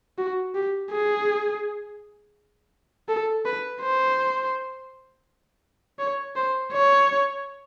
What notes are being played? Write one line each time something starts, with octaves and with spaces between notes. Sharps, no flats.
F#4
G4
G#4
A4
B4
C5
C#5
C5
C#5